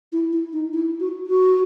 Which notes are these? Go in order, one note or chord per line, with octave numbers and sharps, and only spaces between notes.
E4
E4
D#4
E4
F#4
F#4